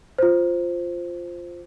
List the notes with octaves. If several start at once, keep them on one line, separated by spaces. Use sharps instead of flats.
F4 C5